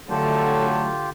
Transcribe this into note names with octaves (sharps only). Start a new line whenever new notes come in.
D3 F#3 A3 F4 G4 A5